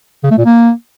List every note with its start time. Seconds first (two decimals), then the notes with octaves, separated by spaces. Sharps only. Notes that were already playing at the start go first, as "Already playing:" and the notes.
0.24 C#3
0.31 A3
0.38 A#2
0.45 A#3